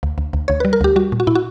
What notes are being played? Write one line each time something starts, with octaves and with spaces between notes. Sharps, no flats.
D2
D2
D2
D2 C#5
G3 B4
A#4
D2 G4
G3 F#4
A#2
F#4
A#2 E4
F#4